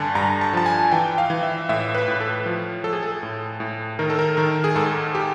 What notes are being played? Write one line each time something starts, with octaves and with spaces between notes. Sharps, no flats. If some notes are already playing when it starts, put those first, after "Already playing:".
Already playing: G2 D3 G#5 A5
G2 A#5
A5
F3 A5
G#5
E3 G5
F5
E3
E5
A2 E5
B4
A2
A4
F3
F3 A4
G#4
A4
A2
A2
D#3 A#4
A4
A#4
D#3 A#4
G#4
G#2 A4
G4